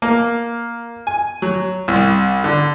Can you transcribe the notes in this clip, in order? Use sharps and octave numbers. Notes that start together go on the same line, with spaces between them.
A#3
G#5
F#3
C2
D3